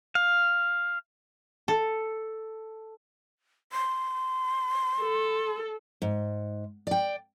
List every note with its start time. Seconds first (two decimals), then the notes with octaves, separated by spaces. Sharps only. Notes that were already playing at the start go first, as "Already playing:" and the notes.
0.15 F5
1.68 A4
3.73 C6
5.01 A4
6.02 G#2
6.87 D5 G5